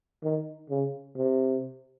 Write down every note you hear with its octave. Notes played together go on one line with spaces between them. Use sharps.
D#3
C#3
C3